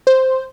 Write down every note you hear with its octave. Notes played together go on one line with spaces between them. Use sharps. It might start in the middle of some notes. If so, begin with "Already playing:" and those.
C5